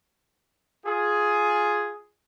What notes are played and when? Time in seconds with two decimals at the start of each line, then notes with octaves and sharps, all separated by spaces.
0.86 F4 G#4